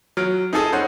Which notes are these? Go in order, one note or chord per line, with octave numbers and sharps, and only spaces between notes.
F#3 F6 D7
D#4 G#4 A4 D#6
C#4 D#4 C5 F#5